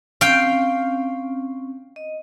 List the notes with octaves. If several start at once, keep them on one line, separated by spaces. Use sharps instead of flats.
C4 C#4 F5 G5
D#5